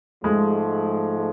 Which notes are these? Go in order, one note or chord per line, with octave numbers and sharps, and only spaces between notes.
G#2 F3 G#3 A3